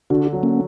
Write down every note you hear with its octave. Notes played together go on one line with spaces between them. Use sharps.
D3 D4 F#4
F#3
A#3 C#4